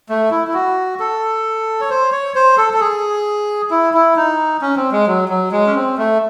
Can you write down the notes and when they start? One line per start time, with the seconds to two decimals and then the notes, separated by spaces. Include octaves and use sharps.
0.09 A3
0.31 E4
0.48 E4
0.54 F#4
1.00 A4
1.81 C#5
1.90 C5
2.12 C#5
2.35 C5
2.58 A4
2.73 A4
2.80 G#4
3.71 E4
3.94 E4
4.16 D#4
4.62 C#4
4.76 C4
4.92 G#3
5.07 F#3
5.29 F#3
5.52 G#3
5.67 C#4
5.75 C4
5.98 A3